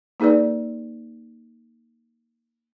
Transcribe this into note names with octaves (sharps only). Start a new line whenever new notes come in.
A#3 D#4 G#4 B4 D5